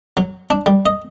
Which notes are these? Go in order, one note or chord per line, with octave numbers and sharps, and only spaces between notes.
F#3
D4
G3
D#5